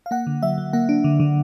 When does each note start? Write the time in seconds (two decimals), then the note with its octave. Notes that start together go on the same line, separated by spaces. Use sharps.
0.06 F5
0.11 A#3 F#5
0.27 D3
0.43 F#3 E5
0.58 F#3
0.73 A#3 F#5
0.89 D4
1.04 D3
1.20 D3